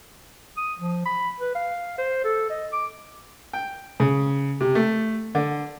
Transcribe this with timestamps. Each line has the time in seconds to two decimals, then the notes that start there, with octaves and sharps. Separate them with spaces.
0.57 D#6
0.79 F3
1.05 B5
1.40 B4
1.55 F5
1.98 C5
2.24 A4
2.50 D#5
2.72 D6
3.53 G5
4.00 C#3
4.60 C3
4.75 A3
5.35 D3